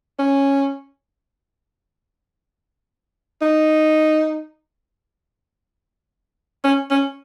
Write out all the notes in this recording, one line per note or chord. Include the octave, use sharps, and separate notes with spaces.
C#4
D#4
C#4
C#4